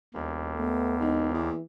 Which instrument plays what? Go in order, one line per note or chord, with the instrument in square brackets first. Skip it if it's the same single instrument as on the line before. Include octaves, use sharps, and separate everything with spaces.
[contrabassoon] E1 [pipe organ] D#2
[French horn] A3 [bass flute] B3
[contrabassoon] E1 [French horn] D#4
[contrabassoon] E2 [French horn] E3